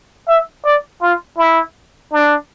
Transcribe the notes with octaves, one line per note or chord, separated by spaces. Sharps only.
E5
D5
F4
E4
D4